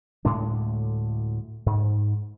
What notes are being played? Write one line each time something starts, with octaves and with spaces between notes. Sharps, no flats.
D2 A2 G#3 D4
G#2